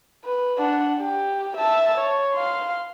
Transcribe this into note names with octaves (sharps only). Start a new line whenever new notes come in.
B4
D4 F#5
G4
E5 A5
C#5
F5 C6